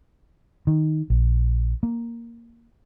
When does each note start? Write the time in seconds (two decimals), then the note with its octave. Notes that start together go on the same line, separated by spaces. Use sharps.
0.67 D#3
1.10 A#1
1.83 A#3